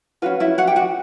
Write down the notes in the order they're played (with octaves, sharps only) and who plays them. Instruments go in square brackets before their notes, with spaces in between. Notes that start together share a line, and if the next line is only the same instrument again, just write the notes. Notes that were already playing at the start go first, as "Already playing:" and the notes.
[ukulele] C#4 F4 F#4 B4 F5
E4 E5
F#4 F#5
G4 G5
F#4 F#5